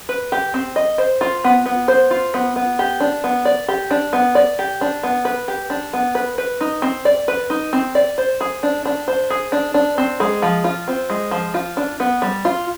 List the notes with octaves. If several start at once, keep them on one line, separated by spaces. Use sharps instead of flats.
B4
G4
C4
D#5
C5
F4
B3
B3
C5
F4
B3
B3
G4
D4
B3
D5
G4
D4
B3
D5
G4
D4
B3
B4
G4
D4
B3
B4
B4
D#4
C4
D5
B4
D#4
C4
D5
C5
G#4
D4
D4
C5
G#4
D4
D4
C4
G#3
F3
F4
C4
G#3
F3
F4
D4
B3
G3
F4